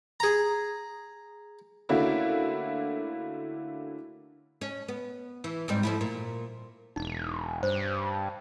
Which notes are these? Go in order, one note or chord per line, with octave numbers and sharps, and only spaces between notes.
G#4 A#5
D3 A3 A#3 C#4 E4 F#4
C#4
B3
E3
G#2 G3 C4
F3 A3 E4
A#2
E1 D#4
G2 C5